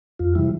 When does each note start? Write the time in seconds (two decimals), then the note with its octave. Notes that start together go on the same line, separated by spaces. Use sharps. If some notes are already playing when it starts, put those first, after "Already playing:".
0.19 F2 F4
0.35 C3 E3 G3 E4